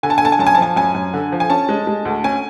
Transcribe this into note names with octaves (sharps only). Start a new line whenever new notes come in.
D3 G#5
A5
G#5
D3 A5
G#5
F#2 A5
G#5
A5
F3 G#5
F#2 G#5
F#2
D3
F3
G#5
C#4 A5
G#3
G#3
D2
C#4 G#5